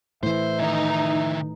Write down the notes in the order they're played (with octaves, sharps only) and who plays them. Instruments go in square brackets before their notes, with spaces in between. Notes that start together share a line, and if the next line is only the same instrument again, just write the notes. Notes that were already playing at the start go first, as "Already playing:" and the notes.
[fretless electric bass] A2 E3 [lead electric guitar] C5 [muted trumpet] E5
[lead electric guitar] D#3 E4 [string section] D#4